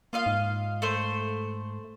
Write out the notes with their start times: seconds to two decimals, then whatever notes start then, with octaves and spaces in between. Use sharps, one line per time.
0.13 A#3 F4 D#5 F5
0.26 G#2
0.82 A3 C5